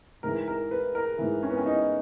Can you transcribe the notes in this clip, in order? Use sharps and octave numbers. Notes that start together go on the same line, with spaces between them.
G#2 E3 A#4
A#4
B4
A#4
G#2 E3
C#4
B3
C#4
D#4